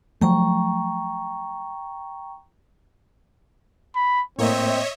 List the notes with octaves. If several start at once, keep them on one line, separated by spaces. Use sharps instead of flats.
F3 F#3 A3 G5 A#5 C#6
B5
A2 A#3 C4 C#5 D#5 E5